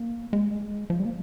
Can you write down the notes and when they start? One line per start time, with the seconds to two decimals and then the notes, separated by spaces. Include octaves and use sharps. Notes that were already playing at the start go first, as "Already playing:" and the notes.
Already playing: A#3
0.33 G#3
0.90 F3
1.00 G3
1.05 A#3